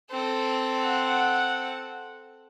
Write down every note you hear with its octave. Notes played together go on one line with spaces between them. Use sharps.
C4 A4
F#5